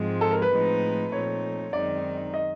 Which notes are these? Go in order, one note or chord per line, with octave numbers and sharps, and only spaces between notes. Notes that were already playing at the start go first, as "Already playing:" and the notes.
Already playing: G#2 F3 G#3 C4
A4
A#4
B4
A2 F3 G#3 C4 D#4
A#2 F3 A3 C4 D#4 C#5
F#2 D#3 G#3 C4 D#4 D5
D#5